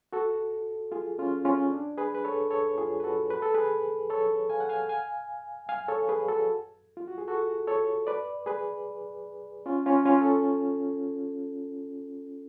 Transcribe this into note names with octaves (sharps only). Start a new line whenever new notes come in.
F#4 A4
F4 G#4
C#4 F4
C#4 F4
D4
G#4 B4
B4
A4 C#5
A4 C#5
F4 G#4
B4
F#4 A4
B4
A4
G#4 B4
A4 C#5
F5 G#5
F#5
F5 G#5
F5 G#5
F5 G#5
A4 C#5
G#4 B4
F#4 A4
F4
F#4
G#4
F#4 A4
A4 C#5
B4 D5
G#4 B4
C#4 F4
C#4 F4
C#4 F4
A4